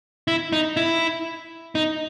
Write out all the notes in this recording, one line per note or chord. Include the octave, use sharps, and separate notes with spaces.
E4
D#4
E4
D#4